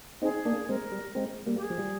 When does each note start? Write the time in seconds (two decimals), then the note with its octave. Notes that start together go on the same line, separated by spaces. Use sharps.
0.22 C4 D#4 G#4
0.45 A#3 D4
0.69 G#3 C4 A#4
0.92 G3
1.15 G#3 C4
1.46 G3 A#3
1.55 G4
1.62 G#4
1.70 F3
1.78 G3